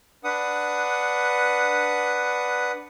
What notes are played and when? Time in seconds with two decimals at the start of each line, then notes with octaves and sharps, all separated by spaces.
0.24 D4 B4 F#5 D#6